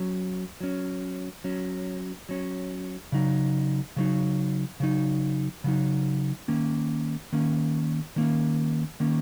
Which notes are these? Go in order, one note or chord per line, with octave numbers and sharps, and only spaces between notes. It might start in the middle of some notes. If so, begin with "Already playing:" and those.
Already playing: F#3 C#4
F#3 C#4
F#3 C#4
F#3 C#4
C#3 F#3 D#4
C#3 F#3 D#4
C#3 F#3 D#4
C#3 F#3 D#4
D#3 A#3 C#4
D#3 A#3 C#4
D#3 A#3 C#4
D#3 A#3 C#4